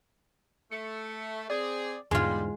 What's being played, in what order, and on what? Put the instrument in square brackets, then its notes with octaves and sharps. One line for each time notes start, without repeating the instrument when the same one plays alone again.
[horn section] A3 [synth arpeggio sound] C#7
[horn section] C4 G#4 [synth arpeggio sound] D5
[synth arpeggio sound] E2 G#2 D3 [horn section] G3 [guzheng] G#3 F4